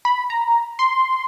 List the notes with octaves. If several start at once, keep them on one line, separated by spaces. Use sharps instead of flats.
B5
A#5
C6